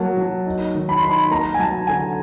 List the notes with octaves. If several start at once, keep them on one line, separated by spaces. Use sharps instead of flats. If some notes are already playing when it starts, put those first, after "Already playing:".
Already playing: F#3 A#3 A5
F#3
D#4
D#3
B5
D#4 C6
B5
A#3 A#5
G#5
F#3 A5
D3 G#5